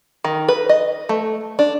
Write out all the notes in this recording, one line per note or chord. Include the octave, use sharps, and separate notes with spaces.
D#3
B4
D#5
A3
D4